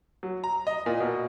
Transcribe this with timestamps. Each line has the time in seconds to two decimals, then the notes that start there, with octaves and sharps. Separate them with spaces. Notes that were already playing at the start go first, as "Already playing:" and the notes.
0.23 F#3
0.44 A#5
0.67 D#5
0.86 A#2
1.00 B2